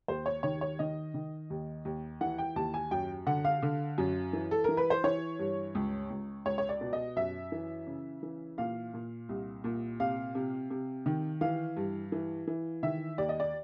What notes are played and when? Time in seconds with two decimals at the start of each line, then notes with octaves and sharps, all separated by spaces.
0.08 D#2 C5
0.26 C#5
0.43 D#3 C#5
0.61 C#5
0.79 D#3 D#5
1.14 D#3
1.50 D#2
1.85 D#2
2.21 E3 F#5
2.38 G5
2.56 D#2 A5
2.74 G#5
2.91 F#2 G5
3.26 D3 F#5
3.45 F5
3.62 D3
3.98 F#2
4.33 E3
4.51 A4
4.64 E3 A#4
4.77 B4
4.90 C5
5.04 E3 C#5
5.39 G2
5.75 C#2
6.10 C#2
6.45 C#2 C#5
6.58 C#5
6.69 D5
6.81 B2
6.93 D#5
7.16 F#2 E5
7.52 E3
7.87 C#3
8.23 E3
8.58 A#2 F5
8.94 A#2
9.29 C2
9.64 A#2
10.00 C3 F5
10.35 C3
10.70 C3
11.06 D#3
11.41 E3 F5
11.77 G2
12.12 E3
12.47 E3
12.83 D#3 E5
13.18 D#2 D5
13.29 D#5
13.40 D5